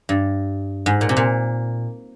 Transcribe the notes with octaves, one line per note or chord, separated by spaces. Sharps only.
G2
G#2
A#2
C3
A#2